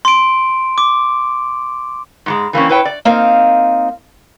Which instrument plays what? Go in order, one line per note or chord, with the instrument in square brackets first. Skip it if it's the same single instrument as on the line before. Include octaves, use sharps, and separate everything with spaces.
[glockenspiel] C6 D7
D6
[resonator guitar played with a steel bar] G#2 G3 G#3
E3 A#3 C4 C#4
E4 B4 C#5 G5
D5
[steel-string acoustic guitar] A#3 C4 D#4 F5